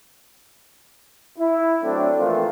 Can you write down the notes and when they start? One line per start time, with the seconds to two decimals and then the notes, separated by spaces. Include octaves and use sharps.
1.39 E4
1.83 F#3 A3 C4 D4
2.18 E3 F3 A3 A#3 C4 F4